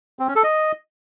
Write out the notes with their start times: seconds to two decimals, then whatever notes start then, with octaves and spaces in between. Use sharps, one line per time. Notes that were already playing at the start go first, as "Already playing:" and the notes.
0.19 C4
0.27 C#4
0.36 A4
0.44 D#5